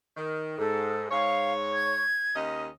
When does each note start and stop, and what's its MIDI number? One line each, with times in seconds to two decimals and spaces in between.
0.17 0.56 51
0.58 1.06 44
0.58 1.09 69
1.11 2.04 44
1.11 2.04 73
1.11 1.53 77
1.73 2.36 92
2.35 2.68 39
2.35 2.68 61
2.35 2.68 75